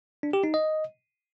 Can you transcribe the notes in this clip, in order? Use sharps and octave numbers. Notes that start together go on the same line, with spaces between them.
D4
G4
D#4
D#5